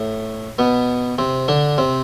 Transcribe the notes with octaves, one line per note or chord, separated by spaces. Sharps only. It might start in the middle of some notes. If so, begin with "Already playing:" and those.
Already playing: A2 A3
B2 B3
C3 C4
D3 D4
C3 C4